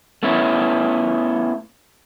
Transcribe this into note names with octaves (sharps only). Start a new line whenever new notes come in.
A3 B3 C#4 E4